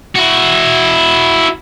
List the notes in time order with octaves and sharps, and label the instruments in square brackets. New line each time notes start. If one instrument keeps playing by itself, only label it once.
[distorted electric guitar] E4 F#4